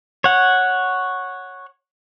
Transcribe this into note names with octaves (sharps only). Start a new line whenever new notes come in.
C#5 F#5